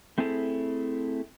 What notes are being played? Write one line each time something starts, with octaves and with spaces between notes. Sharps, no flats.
A3 C4 E4 G#4 A4